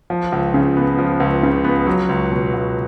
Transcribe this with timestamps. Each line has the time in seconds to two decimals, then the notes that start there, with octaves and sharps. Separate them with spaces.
0.10 F3
0.32 C#2
0.54 C#3
0.77 B3
0.98 F3
1.20 C#2
1.43 C#3
1.65 B3
1.86 F#3
2.09 C#2
2.31 B2
2.53 C#2